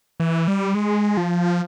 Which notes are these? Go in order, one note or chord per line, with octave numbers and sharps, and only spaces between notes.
E3
G3
G#3
F3